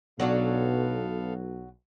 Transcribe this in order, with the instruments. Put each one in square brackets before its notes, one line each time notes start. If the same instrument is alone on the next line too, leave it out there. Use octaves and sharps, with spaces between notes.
[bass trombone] B1 [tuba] B2 [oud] F#3 D4 F#4 [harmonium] B3 A4 F5